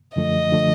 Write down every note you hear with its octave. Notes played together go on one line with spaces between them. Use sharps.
F#2 D3 F3 A3 D#5
D3 F3 A3